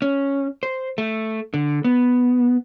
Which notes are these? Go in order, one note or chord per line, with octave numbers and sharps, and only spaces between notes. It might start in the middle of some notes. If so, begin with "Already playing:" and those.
C#4
C5
A3
D3
B3